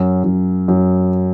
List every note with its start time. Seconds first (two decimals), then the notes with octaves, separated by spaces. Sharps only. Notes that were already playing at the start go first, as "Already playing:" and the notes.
Already playing: F#2
0.24 F#2
0.68 F#2